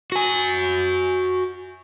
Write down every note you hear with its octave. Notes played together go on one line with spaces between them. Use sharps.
F#4 G#5